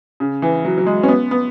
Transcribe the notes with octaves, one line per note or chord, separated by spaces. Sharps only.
C#3
E3
F#3
F#3
G#3
C#4
B3
B3